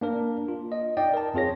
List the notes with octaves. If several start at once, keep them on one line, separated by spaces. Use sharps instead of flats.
A#3 D4 A#4
F4
D#5
D#4 D5 D#5 G5
A#4 A5
F2 C4 F4 G#4 C#5 A#6